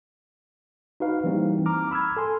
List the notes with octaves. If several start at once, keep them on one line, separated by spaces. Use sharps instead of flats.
D#4 F#4 B4 F5
E3 G3 A#3 C4 D#4
A#5 D6 F6
B5 E6 F6 G#6
A4 G#5 C6